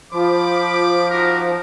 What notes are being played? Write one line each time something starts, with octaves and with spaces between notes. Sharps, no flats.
F3 B5 D6
D#4 F#4 A#4